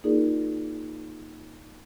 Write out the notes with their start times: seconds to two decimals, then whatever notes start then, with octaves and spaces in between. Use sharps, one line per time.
0.04 A#3 D#4 F4 G#4 A#4 D5